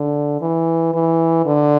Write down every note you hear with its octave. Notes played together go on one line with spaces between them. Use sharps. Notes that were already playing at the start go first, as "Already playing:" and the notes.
Already playing: D3
E3
E3
D3